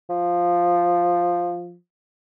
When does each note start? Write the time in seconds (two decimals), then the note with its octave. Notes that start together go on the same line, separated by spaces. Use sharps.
0.09 F3